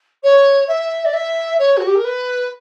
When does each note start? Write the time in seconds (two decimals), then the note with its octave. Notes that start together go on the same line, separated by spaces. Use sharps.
0.23 C#5
0.68 E5
1.04 D5
1.13 E5
1.59 C#5
1.77 F#4
1.86 G4
1.95 A#4
2.04 B4